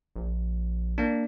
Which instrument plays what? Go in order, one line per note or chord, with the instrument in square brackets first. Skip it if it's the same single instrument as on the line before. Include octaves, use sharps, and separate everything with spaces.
[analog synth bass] A#1
[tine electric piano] A#3 D4